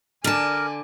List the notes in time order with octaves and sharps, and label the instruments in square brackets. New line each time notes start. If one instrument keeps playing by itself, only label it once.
[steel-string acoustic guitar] D3 A5 [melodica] A#4 [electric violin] D5 G#5